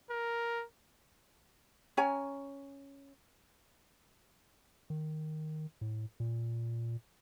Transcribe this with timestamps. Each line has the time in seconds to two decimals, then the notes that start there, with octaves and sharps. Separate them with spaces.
0.11 A#4
1.97 C#4 C#5 G#5 A#5
4.90 D#3
5.81 A2
6.20 A#2